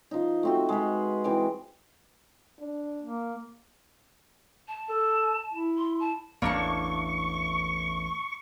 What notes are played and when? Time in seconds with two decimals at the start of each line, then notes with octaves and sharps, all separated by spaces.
0.11 F3 D#4
0.43 A3 C4 F#4
0.69 G#3 B4
1.24 E3 C4 D6
2.60 D4
3.02 A#3
4.68 A5
4.90 A4
5.54 E4
5.77 C6
5.99 A5
6.42 A1 E2 A#3 D4 A5 C#6